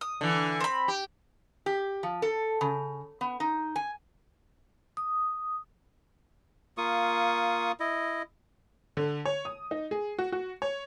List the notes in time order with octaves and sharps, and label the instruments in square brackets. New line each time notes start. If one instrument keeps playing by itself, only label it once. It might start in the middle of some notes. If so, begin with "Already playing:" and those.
[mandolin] D#6
[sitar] D3 E3
[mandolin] C4 B5
[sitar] G4
[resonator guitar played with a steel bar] G4
F3
A4
C#3
B3
D#4
G#5
[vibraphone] D#6
[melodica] A#3 F4 C#6 D#6
E4 D#5
[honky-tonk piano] D3
C#5
D#6
D#4
G#4
F#4
F#4
C#5